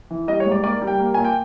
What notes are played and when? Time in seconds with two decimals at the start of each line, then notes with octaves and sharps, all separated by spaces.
0.10 E3
0.28 G3 D#5
0.40 C#5
0.46 G#2
0.52 D5
0.64 A#3 D5
0.82 G3
0.87 G5
1.00 A#3
1.14 A#2 G#5
1.25 G5